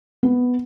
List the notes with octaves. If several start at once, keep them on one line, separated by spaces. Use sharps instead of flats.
B3